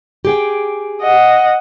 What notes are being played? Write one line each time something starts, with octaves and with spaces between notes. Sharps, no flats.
G4 G#4 G5
D#5 F#5